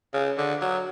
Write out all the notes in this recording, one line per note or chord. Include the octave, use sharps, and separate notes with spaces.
C#3
D3
F#3